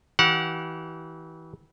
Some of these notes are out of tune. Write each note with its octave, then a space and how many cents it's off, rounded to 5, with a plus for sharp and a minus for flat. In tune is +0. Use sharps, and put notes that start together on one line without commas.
E3 -25 G4 -40 F#5 -25